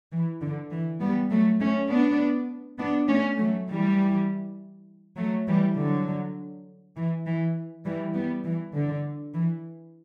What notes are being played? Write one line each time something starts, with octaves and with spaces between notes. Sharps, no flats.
E3
D3
E3
G3 B3
F#3 A3
A3 C#4
B3 D4
B3 D4
A3 C#4
F#3 A3
E3 G3
F#3 A3
E3 G3
D3 F#3
E3
E3
E3 G3
G3 B3
E3
D3
E3